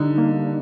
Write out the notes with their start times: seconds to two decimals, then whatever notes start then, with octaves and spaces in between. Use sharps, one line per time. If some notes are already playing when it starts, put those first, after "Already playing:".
Already playing: D3 G3 D4 D#4
0.18 A#3